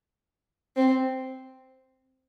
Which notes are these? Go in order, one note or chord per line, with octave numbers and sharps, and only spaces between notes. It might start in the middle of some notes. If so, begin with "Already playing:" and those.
C4